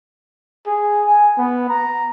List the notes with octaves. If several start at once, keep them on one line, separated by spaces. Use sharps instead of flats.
G#4
G#5
B3
A#5